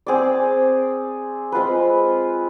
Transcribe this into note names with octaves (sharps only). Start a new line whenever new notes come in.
C4 G#4 D5
G#3 C4 F4 B4